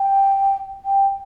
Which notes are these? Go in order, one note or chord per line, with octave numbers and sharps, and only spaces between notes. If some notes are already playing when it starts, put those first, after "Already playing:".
Already playing: G5
G5